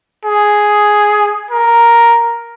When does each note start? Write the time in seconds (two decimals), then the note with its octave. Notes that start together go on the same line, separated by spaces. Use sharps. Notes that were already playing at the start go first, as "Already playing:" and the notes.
0.25 G#4
1.51 A#4